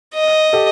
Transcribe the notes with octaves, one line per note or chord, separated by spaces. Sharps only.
D#5
G4 A4